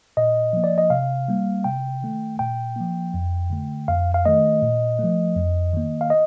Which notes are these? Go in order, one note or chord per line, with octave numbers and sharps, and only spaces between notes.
A#2 D#5
F3 A#3
D5
D#5
C3 F5
G3 A#3
C3 G5
D#3 A3
A#2 G5
F3 A#3
F2
D3 A3
F2 F5
F5
D#3 A3 D#5
A#2
F3 A3
F2
D#3 A#3
F5
D#5